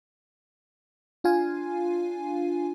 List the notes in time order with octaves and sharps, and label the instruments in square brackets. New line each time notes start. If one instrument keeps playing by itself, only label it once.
[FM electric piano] D4 F4 F5 G#5